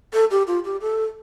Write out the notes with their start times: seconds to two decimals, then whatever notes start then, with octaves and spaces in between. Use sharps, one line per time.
0.13 A4
0.31 G4
0.47 F4
0.65 G4
0.81 A4